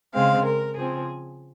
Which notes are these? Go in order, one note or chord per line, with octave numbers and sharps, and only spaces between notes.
C#3 G#3 C4 F5
A#4
C#3 F3 C4 G#4